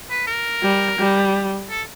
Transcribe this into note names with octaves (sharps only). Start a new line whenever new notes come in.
B4
A#4
G3
G3
A4